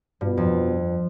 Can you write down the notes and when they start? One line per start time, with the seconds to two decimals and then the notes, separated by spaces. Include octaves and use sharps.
0.21 G2 B2 B3 F4 B4
0.37 F2